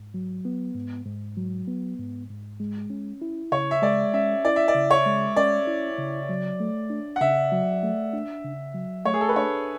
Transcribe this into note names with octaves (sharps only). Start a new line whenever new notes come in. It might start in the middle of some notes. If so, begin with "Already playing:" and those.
Already playing: G#2
F#3
B3
G#2
G#2
F#3
B3
G#2
G#2
G#3
C#4
E4
C#3 C#5
E5
G#3 D5
C#4 E5
E4 D5
E5
D5
C#3
C#5
G#3
C#4 D5
E4
C#3
F#3
A3
D4
F#5
C#3 E5
F#3
A3
D4
C#3
F#3
A3 C#5
G#4
A4
B4
D4 C#5